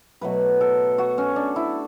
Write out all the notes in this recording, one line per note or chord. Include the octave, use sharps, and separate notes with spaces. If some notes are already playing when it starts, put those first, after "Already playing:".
B2 F#3 A3 B4
A4
F#4
C#4
D4
E4